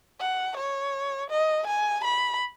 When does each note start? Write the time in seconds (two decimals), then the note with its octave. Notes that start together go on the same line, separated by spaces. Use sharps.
0.20 F#5
0.57 C#5
1.30 D#5
1.67 G#5
2.04 B5